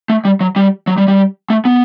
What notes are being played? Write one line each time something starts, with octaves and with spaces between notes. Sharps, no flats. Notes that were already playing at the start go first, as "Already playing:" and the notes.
A3
G3
F#3
G3
F#3
G3
G3
A3
B3